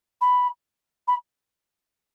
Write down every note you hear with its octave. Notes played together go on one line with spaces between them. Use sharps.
B5
B5